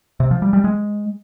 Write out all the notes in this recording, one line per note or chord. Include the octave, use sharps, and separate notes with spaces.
C3
F3
G3
G3
G#3